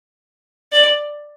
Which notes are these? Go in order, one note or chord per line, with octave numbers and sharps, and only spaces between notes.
D5